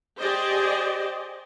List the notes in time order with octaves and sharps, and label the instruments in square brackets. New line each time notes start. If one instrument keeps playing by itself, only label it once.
[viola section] G4 G#4 C5 D5 D#5